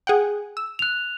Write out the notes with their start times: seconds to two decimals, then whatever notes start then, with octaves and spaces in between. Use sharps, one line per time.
0.07 G#4 F#5 G5
0.57 E6
0.79 F#6 F7